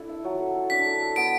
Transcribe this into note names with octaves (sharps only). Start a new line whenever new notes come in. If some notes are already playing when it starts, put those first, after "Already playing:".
Already playing: D4 E4 A4
E5
F#3
A4
A4
D4 B6
A4
A4
B3 D7